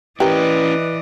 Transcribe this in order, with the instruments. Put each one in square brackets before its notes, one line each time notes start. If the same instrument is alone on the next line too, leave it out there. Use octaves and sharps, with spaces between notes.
[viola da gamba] E3 D5 D#5 [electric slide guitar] C#4 E4 [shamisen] G4 A#4 [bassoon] B4